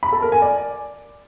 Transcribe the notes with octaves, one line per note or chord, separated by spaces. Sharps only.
B5
A4
A#4
G#5
D5